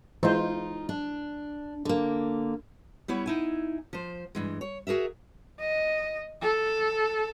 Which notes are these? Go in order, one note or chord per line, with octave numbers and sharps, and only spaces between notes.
E3 G#3 D#4 F4 C5
D4
D3 A#3
G3 B3 E4 C#5
D#4 E4 G#5
F3 C5
G2 E3 G#3
C#5
F#4 G#4 A#4 E5
D#5
A4